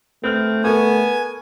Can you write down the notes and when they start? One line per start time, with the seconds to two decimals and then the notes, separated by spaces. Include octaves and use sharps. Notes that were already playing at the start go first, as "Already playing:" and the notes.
0.24 A3 C4 B4 F6
0.64 B3 A4 A#4 G#5 C#6